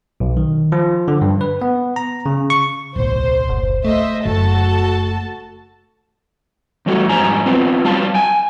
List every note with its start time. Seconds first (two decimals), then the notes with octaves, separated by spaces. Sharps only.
0.20 B1
0.37 D#3
0.72 F3
1.08 D3
1.21 G2
1.41 B4
1.62 B3
1.96 A#5
2.26 C#3
2.50 C#6
2.96 D1 B1 C5
3.49 F#1
3.85 A3 C5 D#5 E5
4.25 F#1 F#4 A4 A5
6.86 E2 G3 A3 F#4 A4
7.09 F2 G#2 G3 G#5 A#5
7.46 B3 C4 F4 B4
7.84 F#3 G3 F5 A5
8.15 G5 G#5